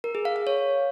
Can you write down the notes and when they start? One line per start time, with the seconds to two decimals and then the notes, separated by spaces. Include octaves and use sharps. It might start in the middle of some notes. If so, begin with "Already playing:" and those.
0.04 A#4
0.15 G#4
0.25 F5
0.36 F5
0.47 C#5